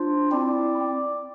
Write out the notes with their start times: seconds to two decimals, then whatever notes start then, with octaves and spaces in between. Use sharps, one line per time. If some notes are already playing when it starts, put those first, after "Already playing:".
Already playing: D4 F4 C5
0.32 C4 E4 D5